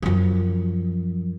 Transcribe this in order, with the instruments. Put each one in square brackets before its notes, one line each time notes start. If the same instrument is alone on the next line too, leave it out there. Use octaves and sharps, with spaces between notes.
[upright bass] F#2 F3